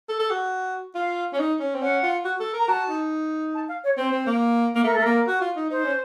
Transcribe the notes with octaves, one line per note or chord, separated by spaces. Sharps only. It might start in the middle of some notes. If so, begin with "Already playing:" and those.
A4
A4
F#4
F4 F5
C#4
D#4
C#4
C4
C#4 F#5
F4
F#4
A4
A#4 A#5
F#4 A5
D#4
A5
F5
C#5
C4 C5
C4
A#3
A#3
A3 A#4
A4
A3
A#3 A#4
F#4
F4
D#4
D#4 C5
C#4